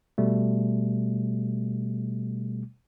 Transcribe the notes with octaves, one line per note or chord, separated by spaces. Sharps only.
B2 G3 A3